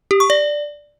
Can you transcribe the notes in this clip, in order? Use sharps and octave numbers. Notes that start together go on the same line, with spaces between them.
G4
C#6
D5